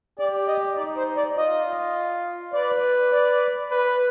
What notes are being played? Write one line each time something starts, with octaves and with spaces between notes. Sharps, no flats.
G4 D5
D#5
D#4 D5
C5
D5
F4 D#5
B4 D5
D5
B4